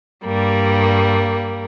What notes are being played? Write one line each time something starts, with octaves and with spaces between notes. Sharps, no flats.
G2 G3 A#3